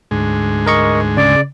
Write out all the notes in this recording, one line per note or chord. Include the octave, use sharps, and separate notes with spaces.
D2 G#2 G#3
A#4 D#5 C#6
C#3 D5